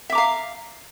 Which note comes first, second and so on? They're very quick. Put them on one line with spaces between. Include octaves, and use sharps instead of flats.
E5 D6 A#5 F5